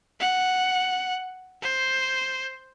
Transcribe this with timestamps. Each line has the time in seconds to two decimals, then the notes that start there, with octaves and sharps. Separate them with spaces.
0.20 F#5
1.62 C5